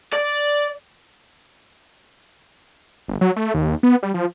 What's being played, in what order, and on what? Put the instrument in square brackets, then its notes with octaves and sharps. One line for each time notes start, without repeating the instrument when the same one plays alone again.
[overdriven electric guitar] D5
[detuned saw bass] G1
F#3
A3
D#2
B3
G3
F3